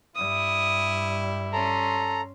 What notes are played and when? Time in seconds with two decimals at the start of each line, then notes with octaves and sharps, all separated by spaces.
0.16 G2 G3 E4 D#6
1.53 C#4 A4 A#5 C6